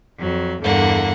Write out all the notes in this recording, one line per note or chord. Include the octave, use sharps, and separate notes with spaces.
F2 F#3
E2 G2 D3 A#3 F#5